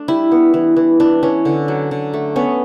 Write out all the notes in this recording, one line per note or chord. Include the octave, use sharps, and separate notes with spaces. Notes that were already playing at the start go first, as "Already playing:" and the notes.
Already playing: A3 D4
G3 E4
B3
E3
E3
E3 D4
E3 C#4
D3
F#3
D3
A3
B3 C#4